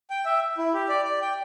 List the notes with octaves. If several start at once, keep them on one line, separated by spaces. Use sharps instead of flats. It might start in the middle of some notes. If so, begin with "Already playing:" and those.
G5
E5
E4
G4
D5
D5
G5